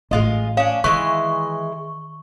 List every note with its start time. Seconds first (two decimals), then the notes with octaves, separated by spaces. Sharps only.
0.11 A1 G#3 F4 D#5
0.57 C#4 D4 F5
0.84 D#3 E3 G#3 C#6